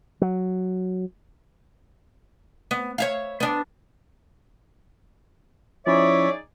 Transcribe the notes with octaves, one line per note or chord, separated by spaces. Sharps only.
F#3
B3
C#5 E5 F5
B3 D4
F3 C#4 D#4 E4 G#4 C#5 D5 E5